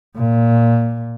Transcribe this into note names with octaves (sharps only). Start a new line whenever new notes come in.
A#2